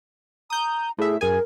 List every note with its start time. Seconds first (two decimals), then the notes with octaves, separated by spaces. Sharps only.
0.50 A#5 D#6 G6
0.99 A2 G#4 E5
1.21 F#2 G#4 A#4 G#5